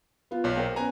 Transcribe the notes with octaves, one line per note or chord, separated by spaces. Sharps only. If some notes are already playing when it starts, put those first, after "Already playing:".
B3 F4
B1 A#2 C#5
A#4 C5 G5
B3 C#4 G#5 A#5